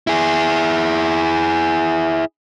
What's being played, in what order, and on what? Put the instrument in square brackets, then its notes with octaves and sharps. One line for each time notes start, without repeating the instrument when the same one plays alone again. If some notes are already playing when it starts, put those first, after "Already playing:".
[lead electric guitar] E4 G#4